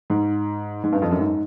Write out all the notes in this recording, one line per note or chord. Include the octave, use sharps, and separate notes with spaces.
G#2
G#2
G2
F2
F#2
G#2